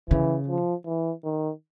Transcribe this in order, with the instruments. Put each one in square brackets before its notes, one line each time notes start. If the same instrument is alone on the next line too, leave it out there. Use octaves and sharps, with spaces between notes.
[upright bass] C#3 [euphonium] E3
[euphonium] F3
E3
D#3